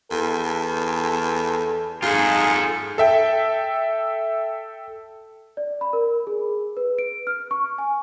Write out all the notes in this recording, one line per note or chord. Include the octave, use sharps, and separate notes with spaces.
E2 A4
G#2 F4 G#4 A4
A4 E5 G5
D5
B5
A#4
G#4
B4
D7
F6
C#6
G#5